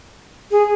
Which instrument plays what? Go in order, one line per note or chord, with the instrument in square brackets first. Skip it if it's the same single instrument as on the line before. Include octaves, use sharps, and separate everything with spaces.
[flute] G#4